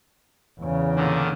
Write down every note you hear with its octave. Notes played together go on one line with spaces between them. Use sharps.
E2 C#3
A#2 D3 D#3